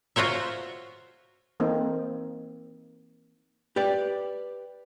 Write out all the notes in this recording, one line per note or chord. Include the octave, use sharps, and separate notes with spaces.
F4 F#4 C5 C#5 E5
E3 A#3 C4 D#4 A4
G4 B4 D5